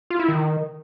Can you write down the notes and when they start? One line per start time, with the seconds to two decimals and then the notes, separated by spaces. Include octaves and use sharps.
0.10 F4
0.19 E4
0.28 D#3